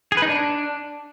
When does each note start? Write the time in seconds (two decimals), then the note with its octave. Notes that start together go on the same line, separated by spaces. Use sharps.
0.12 G#4
0.17 B4
0.22 D#4
0.27 D4